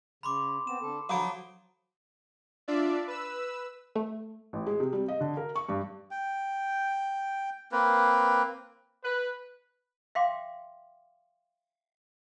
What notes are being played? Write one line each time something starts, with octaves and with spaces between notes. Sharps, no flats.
C#3 B5 C6 D6
B3 C4 E7
D3 A4
D3 F3 F#3 F5 A#5 B5 D#6 D7
D4 F4 D5 E5
B4 E6
A3
A1
G#3
C3
G3
D#5
D3
A#4
C#6
G2
G5
A#3 C4 B4
B4
E5 F5 G5 C6 D6